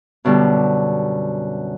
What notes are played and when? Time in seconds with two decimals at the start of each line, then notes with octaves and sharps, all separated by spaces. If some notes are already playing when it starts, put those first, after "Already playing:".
0.25 F#2 B2 D3 G3